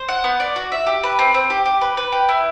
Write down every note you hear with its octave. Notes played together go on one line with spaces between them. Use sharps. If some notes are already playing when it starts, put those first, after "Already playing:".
Already playing: C5
F#5
B3
D5
F#4
E5
G4
B4
C4
C4
G4
G4
B4
B4
G4
E4